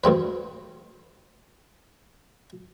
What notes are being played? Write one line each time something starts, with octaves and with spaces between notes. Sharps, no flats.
D2 G2 C4 B4